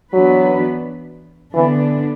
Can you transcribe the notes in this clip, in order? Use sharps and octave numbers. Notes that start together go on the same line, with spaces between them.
E3 F#3 B3 D4 B4
D3 E3 B3 D4